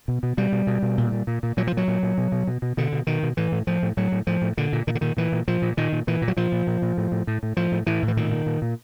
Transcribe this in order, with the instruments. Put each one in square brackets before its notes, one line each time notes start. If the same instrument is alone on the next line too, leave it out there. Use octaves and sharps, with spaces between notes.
[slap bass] B2
B2
B2 G3
B2
B2
B2
A#2
A#2
A#2
A#2
A#2 F#3
F3
A#2
F#3
A#2
A#2
B2
B2
B2
B2
B2 D3
B2
B2 D#3
B2
A2 E3
A2
A2 F3
A2
A2 F#3
A2
A2 F3
A2
A#2 D3
A#2
A#2 D#3
D3
A#2 D#3
A#2 E3
A#2
A#2 F3
A#2
A#2 D#3
A#2
A#2 E3
A#2
F#3
A#2 F3
A#2
A#2
A#2
A2
A2
A2
A2
A2 F3
A2
A2 E3
A2
E3
A#2 D#3
A#2
A#2
A#2